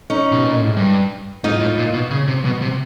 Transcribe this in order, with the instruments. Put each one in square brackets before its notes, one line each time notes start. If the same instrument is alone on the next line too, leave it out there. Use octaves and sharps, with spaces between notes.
[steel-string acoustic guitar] C#4 D#4
[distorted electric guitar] B2
A#2
A2
G#2
G2
[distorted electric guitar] G#2 [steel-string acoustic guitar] D#4 F4
[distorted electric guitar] A2
A#2
B2
C#3
C3
B2
C3